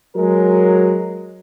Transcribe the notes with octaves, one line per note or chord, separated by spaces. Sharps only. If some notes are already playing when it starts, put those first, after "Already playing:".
F#3 G#3 A#4